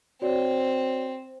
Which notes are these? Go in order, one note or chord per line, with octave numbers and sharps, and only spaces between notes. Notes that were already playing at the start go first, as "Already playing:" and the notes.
C4 F#4 C#5 D5